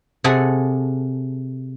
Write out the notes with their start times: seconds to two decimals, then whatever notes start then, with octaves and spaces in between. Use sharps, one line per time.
0.24 C3 G#4 A4 F#5 G#5